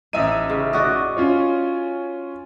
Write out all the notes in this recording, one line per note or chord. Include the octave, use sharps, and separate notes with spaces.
A1 D#4 E5 D#7
C#3
F#4 D5 D#5
C#4 F4 C#5